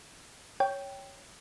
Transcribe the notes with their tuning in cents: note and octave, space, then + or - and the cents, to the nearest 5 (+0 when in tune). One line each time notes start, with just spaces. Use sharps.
C#5 +0 G5 +0